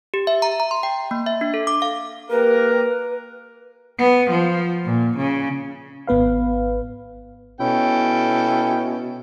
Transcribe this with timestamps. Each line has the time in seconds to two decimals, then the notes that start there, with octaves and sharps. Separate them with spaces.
0.14 G4
0.27 E5
0.42 A#5
0.60 A#5
0.71 C6
0.83 G5
1.11 A#3
1.26 E5
1.41 D4
1.54 A4
1.67 D6
1.82 F5
2.31 A#3 G4 A#4 B4
3.99 B3
4.30 F3
4.85 A#2
5.17 C#3
6.07 G#1 B3 B4 F5
7.60 B2 C#4 E4 A4 G5